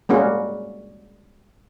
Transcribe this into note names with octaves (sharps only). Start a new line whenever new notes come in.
G3 G#3 A#3 C#4 F#4